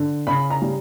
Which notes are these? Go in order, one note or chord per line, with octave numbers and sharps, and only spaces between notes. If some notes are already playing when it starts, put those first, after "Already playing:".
Already playing: D3
C#3 B5
A#5
G3